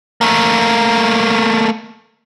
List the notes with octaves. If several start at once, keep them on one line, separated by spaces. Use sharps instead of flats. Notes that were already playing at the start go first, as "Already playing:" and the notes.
A3 A#3